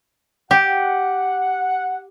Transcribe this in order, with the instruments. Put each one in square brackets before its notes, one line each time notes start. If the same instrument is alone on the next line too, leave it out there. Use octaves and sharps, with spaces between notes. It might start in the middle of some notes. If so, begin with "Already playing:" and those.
[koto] G4 [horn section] F#5